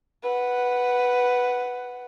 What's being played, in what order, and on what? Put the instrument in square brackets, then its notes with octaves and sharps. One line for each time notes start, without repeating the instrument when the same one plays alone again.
[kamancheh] B4 F#5